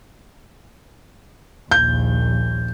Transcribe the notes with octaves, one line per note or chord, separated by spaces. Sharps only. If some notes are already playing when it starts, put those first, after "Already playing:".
A#1 D#2 G6